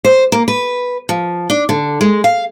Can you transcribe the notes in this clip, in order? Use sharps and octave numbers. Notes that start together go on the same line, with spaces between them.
C5
A#3
B4
F3
D4
D3
G#3
F5